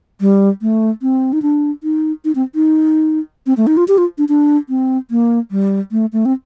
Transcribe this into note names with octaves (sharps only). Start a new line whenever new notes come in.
G3
A3
C4
D#4
D4
D#4
D#4
C4
D#4
C4
A3
D#4
F4
G4
F4
D4
D4
C4
A#3
G3
A3
A3
C4